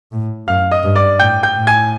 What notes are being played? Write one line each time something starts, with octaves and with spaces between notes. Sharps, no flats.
A2
F#2 F5 F6
D#5 D#6
G2
D5 D6
A2 G5 G6
G5 G6
A2
G#5 G#6